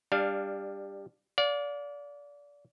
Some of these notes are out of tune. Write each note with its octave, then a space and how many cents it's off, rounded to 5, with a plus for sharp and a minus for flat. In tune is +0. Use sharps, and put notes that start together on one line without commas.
G3 +15 D4 +0 F5 +0
D5 -25 F5 +30